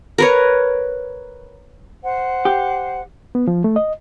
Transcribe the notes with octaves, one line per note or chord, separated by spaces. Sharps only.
A#4 B4 C#5
C5 F#5
G4
B3
F3
A3
D#5